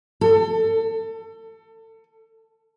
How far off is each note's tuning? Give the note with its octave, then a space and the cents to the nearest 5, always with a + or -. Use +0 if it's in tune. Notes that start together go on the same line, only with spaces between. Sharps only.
A4 +30